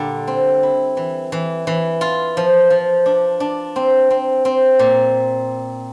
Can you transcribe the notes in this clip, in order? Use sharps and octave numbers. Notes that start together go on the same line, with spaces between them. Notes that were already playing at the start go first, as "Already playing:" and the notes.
Already playing: A#2 D3 G3 F4
C4
E4
E3
E3
E3
F4
F3
F3
D4
D4
C4
C4
C4
A#2